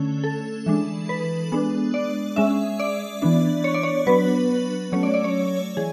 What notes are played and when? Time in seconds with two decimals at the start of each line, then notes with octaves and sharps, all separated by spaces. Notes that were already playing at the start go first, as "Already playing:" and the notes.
Already playing: D3 A3 C#4
0.24 A4
0.66 E3 G#3 D4
1.09 B4
1.52 G#3 B3 D4
1.94 D5
2.36 G#3 C#4 E5
2.80 D5
3.22 E3 B3 D4
3.64 C#5
3.74 D5
3.83 C#5
4.06 F#3 B3 D4 B4
4.92 F#3 A3 C#4 C#5
5.03 D5
5.14 D5
5.24 C#5
5.77 E3 G#4